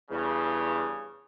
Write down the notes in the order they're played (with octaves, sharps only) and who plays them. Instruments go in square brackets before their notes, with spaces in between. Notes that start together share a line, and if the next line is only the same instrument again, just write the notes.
[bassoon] E2 [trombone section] G2 C#3